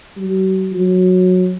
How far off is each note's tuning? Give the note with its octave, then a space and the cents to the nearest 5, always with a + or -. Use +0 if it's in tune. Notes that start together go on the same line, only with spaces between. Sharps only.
F#3 +40
F#3 -15